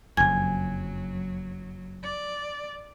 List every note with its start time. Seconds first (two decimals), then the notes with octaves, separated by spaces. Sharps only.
0.17 F#1 F2 F#3 G#5 G#6
2.03 D5